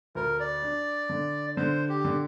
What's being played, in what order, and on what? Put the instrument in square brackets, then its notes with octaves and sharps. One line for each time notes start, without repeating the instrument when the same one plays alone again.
[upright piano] D2 [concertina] A#4
[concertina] D5
[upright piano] D4
D3
[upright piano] D3 [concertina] C5
[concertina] G4
[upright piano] D3